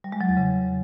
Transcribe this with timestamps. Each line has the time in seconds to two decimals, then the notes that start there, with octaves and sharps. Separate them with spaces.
0.04 G3
0.12 G#3
0.21 F#3
0.29 E2
0.37 C#3